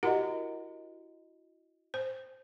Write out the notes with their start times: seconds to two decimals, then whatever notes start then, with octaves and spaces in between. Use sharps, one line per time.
0.03 E4 F#4 G4 A#4 D#5 F#5
1.94 C5